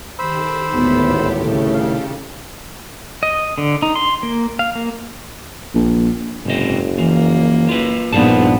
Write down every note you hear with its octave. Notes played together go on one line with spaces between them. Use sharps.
D#3 G4 A4 C5 B5 E6
G#1 D2 A2 B3
C2 A2 C#3 A3
F5
D#5
D3
D#4
C6
A#3
F5
A#3
A#1
F#1 G#2 C3 D#5
E3 F3 A#3
F4 B4
A#1 G2 A#2 B3 D#4 G#4 A5